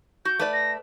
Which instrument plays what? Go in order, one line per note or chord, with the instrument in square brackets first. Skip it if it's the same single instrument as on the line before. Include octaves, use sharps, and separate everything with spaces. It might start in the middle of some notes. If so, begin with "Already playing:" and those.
[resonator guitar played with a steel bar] F#4 [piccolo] G6
[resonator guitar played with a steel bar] A3 B4 D5
[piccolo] A#6